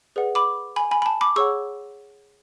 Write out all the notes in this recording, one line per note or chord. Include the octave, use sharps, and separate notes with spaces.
G#4 B4 D5 F#5
B5 D6
G#5 B5
G#5 B5
B5
A5
B5 D6
G#4 C#5 F#5 C#6 E6